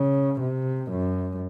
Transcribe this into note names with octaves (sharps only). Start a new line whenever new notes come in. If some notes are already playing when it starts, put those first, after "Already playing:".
Already playing: C#3
C3
F#2